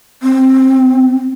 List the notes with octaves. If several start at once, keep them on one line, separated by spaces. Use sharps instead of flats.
C4